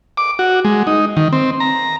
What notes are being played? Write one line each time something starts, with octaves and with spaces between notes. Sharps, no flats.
D6
F#4
G#3
D#4
D#3
C4
A#5